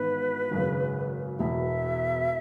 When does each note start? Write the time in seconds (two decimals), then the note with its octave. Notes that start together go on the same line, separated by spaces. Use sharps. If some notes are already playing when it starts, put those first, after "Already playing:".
Already playing: G#1 G#2 E3 B3 E4 B4
0.51 G#1 F#2 C#3
1.39 E1 E2 B2 E5